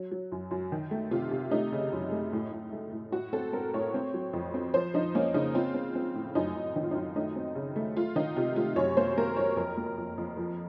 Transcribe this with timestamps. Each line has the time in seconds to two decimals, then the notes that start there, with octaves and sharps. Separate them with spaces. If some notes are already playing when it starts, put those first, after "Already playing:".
Already playing: F#3
0.11 F#3
0.32 F#2
0.51 F#2
0.72 D#3
0.91 A3
1.11 C3 F4
1.31 C3
1.51 A3 D#4
1.72 C#3
1.93 F#2
2.12 A3
2.33 A2
2.52 A2
2.72 A3
2.92 A2
3.12 A2 F#4
3.33 C4 A4
3.53 C4 A#4
3.74 A2 C#5
3.94 C4
4.14 F#3
4.33 F2
4.54 C4
4.74 F3 C5
4.94 F3 D#4
5.15 A#3 C#4
5.34 C#3 D#4
5.55 C4 F4
5.74 C4
5.95 C4
6.15 A2
6.35 F#2 D#4
6.55 F#2
6.76 D#3 D#4
6.83 F4
6.91 F#2 D#4
7.16 A3 D#4
7.36 C4
7.55 C#3
7.76 A3
7.96 A3 F4
8.16 D#3 D#4
8.36 C3 F4
8.56 A3 F4
8.76 F#2 C#5
8.97 A#3 C5
9.17 A#3 A#4
9.37 F#3 C#5
9.57 F2 A#4
9.77 A#3
9.97 F2
10.18 F2
10.37 F3